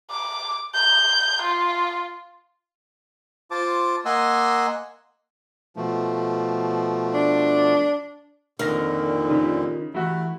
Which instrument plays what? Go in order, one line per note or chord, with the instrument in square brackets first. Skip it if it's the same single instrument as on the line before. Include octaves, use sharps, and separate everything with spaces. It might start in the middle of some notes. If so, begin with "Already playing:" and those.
[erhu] D6
G6
F4
[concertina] F4 C5 A5 D6
A#3 D#5 F#5 G#5 C6 E6
[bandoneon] B2 F3 A3
[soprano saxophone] D4
[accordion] F2 A#2 D3 [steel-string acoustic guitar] D#3 [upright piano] F6 A#6
[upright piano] C#3 [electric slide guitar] D#4 F4 G4
[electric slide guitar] E3 G4 [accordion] A3 [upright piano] E4 F#4